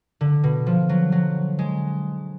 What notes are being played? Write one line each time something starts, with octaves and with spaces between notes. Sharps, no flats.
D3
B2
F3
F#3
F#3
G#3